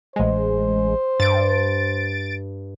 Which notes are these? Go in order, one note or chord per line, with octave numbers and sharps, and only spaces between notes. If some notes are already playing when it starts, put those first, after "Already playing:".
A1 G#3 C5
G2 A6 D7